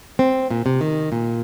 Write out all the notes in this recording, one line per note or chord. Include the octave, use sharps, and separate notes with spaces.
C4
A#2
C3
D#3
A#2